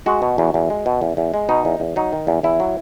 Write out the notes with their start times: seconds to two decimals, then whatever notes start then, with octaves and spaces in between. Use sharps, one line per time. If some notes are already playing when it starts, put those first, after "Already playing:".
0.06 G#3 F#4
0.22 B2
0.38 E2
0.54 E2
0.70 G#3
0.86 B2
1.01 E2
1.17 E2
1.34 G#3
1.49 B2 D#4
1.65 E2
1.80 E2
1.96 F#3 D#4
2.13 D#3
2.27 E2
2.43 E2 E4
2.60 F#3